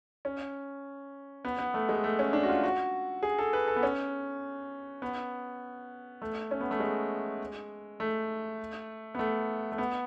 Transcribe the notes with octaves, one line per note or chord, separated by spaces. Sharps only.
C#4
B3
B3
A3
G#3
A3
C#4
D4
F#4
F4
F#4
G#4
A4
B4
A4
B3
C#4
B3
A3
C#4
B3
A3
G#3
A3
B3
A3
A3
B3